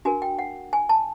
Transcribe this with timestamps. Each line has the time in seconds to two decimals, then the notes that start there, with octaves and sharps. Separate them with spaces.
0.05 D4 F#4 A#4 G#5
0.22 G5
0.39 F#5
0.73 G#5
0.89 A5